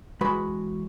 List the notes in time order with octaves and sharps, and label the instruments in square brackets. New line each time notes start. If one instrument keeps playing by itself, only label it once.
[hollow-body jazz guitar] E2 G#3 F#4 B4 B5